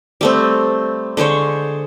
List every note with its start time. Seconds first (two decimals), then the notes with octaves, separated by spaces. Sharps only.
0.21 G3 A3 C4
1.17 D3 G#3 C5 C#5